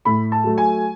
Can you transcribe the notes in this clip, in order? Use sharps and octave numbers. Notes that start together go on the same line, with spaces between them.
A2 B5
A5
F#3 A3
G#5